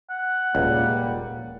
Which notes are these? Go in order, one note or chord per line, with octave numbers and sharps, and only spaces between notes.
F#5
D#1 C#2 A#2 G3 A#3